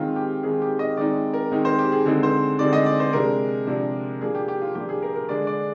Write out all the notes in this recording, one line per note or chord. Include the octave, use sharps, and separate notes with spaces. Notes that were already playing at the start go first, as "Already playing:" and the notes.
Already playing: D#3 G#3 C4 D#4 F4
G4
D#3 G#3 C4 D#4 G#4
G4
D#5
D#3 G#3 C4 D#4 D5
A#4
D#3 G#3 C4 D#4
C5
G4
G#4
D3 G#3 C4 D#4
C5
D3 G#3 C4 D#4 D5
D#5
D5
C5
C3 F3 G#3 D4 A#4
C3 F3 G#3 D4
F3 A#3 D4 G#4
G4
G4
F4
F3 A#3 D4 G4
G#4
A#4
A#4
D3 G#3 D4 D5
D5